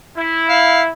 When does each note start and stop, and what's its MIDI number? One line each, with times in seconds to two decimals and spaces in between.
0.17 0.91 64
0.49 0.81 77